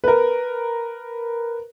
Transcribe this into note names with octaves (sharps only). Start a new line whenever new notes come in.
A#4 B4